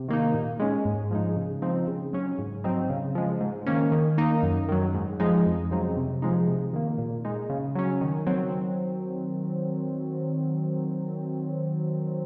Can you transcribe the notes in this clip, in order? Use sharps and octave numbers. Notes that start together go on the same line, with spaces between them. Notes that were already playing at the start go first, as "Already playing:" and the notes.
Already playing: C3
D#3 A#3 D#4
A#2
G#3 C#4
G#2
F3 G#3 D#4
C#3
F3 C4 D#4
C#3
F#3 C#4
G#2
F#3 C4 D#4
C#3
F3 G#3
G#2
D#3 A#3 C#4
D#3
A#3 D#4
F#2
D#3 F#3
G#2
F3 G#3 D#4
F2
C#3 F#3 C4 D#4
C3
F3 G#3 D#4
C3
D#3 A#3
A#2
G#3 D#4
C#3
F#3 C#4
D#3
F#3 C4